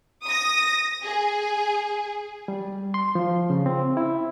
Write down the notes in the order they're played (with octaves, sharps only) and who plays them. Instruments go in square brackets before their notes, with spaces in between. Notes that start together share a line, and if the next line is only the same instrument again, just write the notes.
[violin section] D#6 A#6
G#4
[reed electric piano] G3
C6
F3
C#3
C4
E4